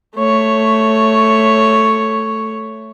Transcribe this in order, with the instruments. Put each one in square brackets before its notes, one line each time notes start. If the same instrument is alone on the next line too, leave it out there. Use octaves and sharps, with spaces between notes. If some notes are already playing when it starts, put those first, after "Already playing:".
[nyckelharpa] A3 C#5